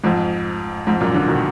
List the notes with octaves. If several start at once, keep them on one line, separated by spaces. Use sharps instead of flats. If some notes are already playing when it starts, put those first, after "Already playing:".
F2 G#2
F2 G#2
F#2 A#2
A#2 D3
B2 D#3